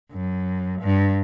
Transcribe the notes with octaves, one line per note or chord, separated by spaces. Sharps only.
F#2
G2